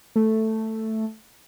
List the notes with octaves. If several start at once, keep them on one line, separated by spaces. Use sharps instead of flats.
A3